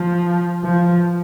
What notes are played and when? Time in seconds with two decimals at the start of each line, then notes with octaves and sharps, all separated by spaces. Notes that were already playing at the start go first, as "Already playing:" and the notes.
Already playing: F3
0.64 F3